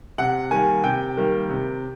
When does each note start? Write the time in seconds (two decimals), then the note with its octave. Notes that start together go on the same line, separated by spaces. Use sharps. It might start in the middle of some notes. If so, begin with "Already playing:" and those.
0.18 C3 F#5
0.51 D#3 G3 A#3 G#5
0.84 C3 G5
1.17 D#3 G3 A#3
1.50 C3